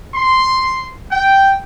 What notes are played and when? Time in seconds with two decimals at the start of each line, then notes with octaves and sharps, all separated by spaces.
0.14 C6
1.11 G5